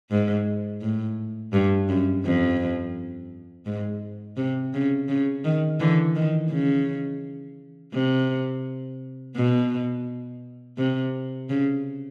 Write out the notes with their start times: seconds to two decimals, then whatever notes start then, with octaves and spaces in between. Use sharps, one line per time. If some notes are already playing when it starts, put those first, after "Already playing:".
0.11 G#2
0.81 A2
1.53 G2
1.89 F#2
2.25 F2
3.66 G#2
4.37 C3
4.74 C#3
5.08 C#3
5.44 D#3
5.80 D3 E3
6.16 D#3
6.51 C#3
7.93 C3
9.36 B2
10.78 C3
11.50 C#3